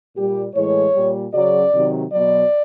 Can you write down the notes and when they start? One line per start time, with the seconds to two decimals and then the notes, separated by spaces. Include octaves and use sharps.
0.15 A#2 G3 G4
0.54 A2 E3 G#3 C#5
0.94 A#2 G3
1.33 C#3 F#3 D5
1.72 C3 D#3 F#3
2.11 B2 F#3 D5